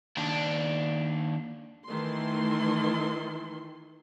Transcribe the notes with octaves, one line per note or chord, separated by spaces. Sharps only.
D#2 D4
D#3 E3 A3 C6